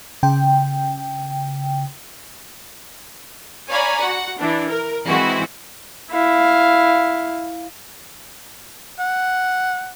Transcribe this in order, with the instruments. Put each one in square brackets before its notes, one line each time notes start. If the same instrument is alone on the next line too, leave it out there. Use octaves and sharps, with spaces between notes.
[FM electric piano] C#3 G5
[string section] C#5 D5 F5 G#5 A#5 B5
F#4 F#5
E3 D4
A#4
E3 G#3 C4 E4 F#4
[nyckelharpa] E4 F5
[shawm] F#5